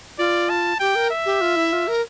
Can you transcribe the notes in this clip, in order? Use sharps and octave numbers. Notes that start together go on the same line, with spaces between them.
F4 D5
A5
G4 G5
A#4
E5
G4
F4
E4
F4
A#4